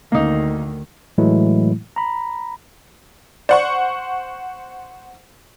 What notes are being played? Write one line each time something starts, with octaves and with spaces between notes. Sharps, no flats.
D2 D#3 A#3 D#4
A2 E3 F#3 G#3 A3 E4
A#5 B5
C5 D5 F#5 C#6